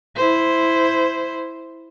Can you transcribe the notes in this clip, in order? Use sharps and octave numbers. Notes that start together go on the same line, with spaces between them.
E4 C5